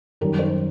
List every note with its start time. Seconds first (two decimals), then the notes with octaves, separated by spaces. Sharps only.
0.21 F#2 D#3 G3 A#4
0.39 C5